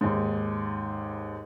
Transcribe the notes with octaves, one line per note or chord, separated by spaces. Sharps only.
D#2 G#2